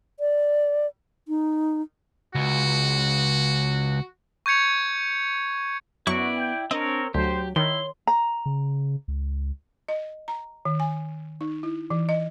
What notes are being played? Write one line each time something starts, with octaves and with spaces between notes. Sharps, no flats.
D5
D#4
C#2 F#4
C#6 G6 G#6 C#7 F7
F#2 B3 E4 F#4 D5 C#6
G5
C4 D4 A#4 C#5 D#5
D2 F#3 G4 C5
D#3 E4 C#5 C6
A#5
C#3
C#2
D#5
A#5
D#3
G#5
D#4
E4
E3
D#5